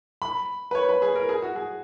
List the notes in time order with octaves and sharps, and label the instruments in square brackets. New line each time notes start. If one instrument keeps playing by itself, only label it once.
[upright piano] B5
B4
C#5
B4
G#4
A#4
G#4
F#4
G#4